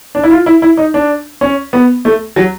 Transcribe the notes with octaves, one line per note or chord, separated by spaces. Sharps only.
D4
E4
F4
E4
E4
D#4
D4
C#4
B3
A3
F#3